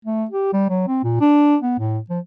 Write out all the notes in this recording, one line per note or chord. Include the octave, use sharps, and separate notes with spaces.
A3
G4
G3
F#3
C4
A#2
D4
B3
A2
F3